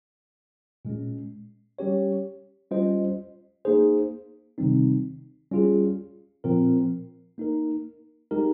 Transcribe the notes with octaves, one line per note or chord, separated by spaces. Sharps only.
A#2 G#3 C#4
G3 C#4 G4 C#5
G3 C#4 F4 C5 D#5
A#3 D#4 G#4 C5
C3 D#3 G3 C4 D#4
G3 C#4 F4 G#4
A#2 F3 C4 F4 A#4
A#3 D#4 A#4
G#3 D#4 G4 A#4